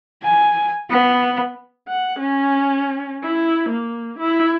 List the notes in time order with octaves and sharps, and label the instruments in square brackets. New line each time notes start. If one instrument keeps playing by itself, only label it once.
[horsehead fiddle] G#5
B3
[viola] F#5
C#4
E4
A#3
E4